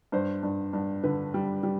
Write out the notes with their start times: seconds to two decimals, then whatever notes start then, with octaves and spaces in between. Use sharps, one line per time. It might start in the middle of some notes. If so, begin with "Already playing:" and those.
0.12 G2 C5
0.43 G2
0.73 G2
1.03 D3 B4
1.34 G3
1.63 G3